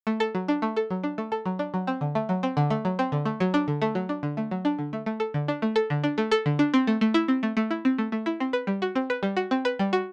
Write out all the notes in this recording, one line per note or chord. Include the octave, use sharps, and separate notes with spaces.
A3
A4
F#3
D4
A3
A4
F#3
D4
A3
A4
F#3
D4
F#3
C4
D3
A3
F#3
C4
D3
A3
F#3
C4
D3
A3
F#3
D4
D3
A3
F#3
D4
D3
A3
F#3
D4
D3
A3
A3
A4
D3
D4
A3
A4
D3
D4
A3
A4
D3
D4
C4
A3
A3
E4
C4
A3
A3
E4
C4
A3
A3
E4
C4
B4
G3
F#4
C4
B4
G3
F#4
C4
B4
G3
F#4